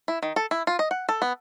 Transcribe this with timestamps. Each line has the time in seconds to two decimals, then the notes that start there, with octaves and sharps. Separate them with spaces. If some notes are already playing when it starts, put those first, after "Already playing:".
0.08 E4
0.23 D#3
0.36 A4
0.51 E4
0.67 F4
0.79 D#5
0.91 F#5
1.09 A4
1.22 B3